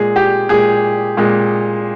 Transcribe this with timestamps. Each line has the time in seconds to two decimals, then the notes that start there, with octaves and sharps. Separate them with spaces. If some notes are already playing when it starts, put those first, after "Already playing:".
Already playing: A#2 G#3 G#4
0.16 G4
0.49 A#2 G#3 G#4
1.17 A#2 G#3